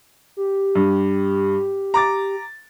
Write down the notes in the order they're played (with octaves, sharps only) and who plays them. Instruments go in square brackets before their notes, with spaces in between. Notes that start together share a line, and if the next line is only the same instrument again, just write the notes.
[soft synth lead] G4
[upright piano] G2
A#5 D6 A6